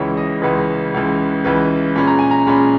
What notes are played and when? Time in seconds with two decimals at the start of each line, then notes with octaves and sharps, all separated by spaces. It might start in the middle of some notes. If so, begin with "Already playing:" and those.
Already playing: C#2 C#3 E3 C#5
0.17 D#5
0.42 C#2 C#3 E3 B4
0.94 C#2 C#3 E3
1.44 C#2 C#3 E3 B4
1.95 A#2 G#3 C#4 B5
2.07 A#5
2.19 G#5
2.31 A#5
2.47 A#2 G#3 C#4 B5